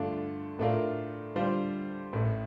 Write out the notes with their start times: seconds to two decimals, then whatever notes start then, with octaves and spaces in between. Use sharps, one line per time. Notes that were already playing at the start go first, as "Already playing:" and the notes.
Already playing: G2 D3 A3 D4 F4
0.59 A2 A3 D4 F4 A#4
1.36 D3 G3 D4 F4 C5
2.13 A1 A2 A3